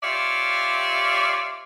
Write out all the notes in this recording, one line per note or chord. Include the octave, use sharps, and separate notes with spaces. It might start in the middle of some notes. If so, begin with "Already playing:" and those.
F4 G4 C#5 D5 E5 F5